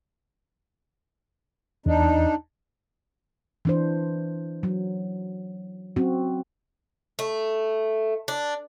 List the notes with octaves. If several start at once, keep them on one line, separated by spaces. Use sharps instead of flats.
E2 D4 D#4
E3 D4 C5
F#3
F#3 C4 C#4 F#4
A3
D4